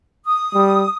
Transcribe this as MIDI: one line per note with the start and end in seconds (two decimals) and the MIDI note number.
0.25 0.97 87
0.54 0.85 55